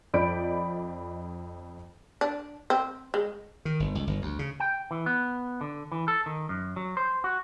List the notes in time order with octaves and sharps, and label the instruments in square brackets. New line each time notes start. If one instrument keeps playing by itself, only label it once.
[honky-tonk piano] F2 D5 D#5 B5 G6 D7
[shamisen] D4
C4
G#3
[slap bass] D#3
G1
C#2
G1
D2
C#3
[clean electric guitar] G5
E3
B3
D3
E3
A4
D#3
F#2
F#3
C5
F#4